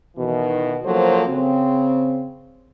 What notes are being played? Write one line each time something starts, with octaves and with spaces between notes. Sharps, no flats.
B2 D#3 E3
C#3 F3 F#3 A#3 A4 C5
C#3 C4